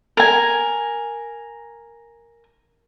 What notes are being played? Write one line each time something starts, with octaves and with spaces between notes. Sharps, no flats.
A#4 G#5